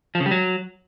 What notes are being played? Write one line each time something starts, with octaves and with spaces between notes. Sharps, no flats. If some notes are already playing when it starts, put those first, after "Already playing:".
F3
C#3
G3
F#3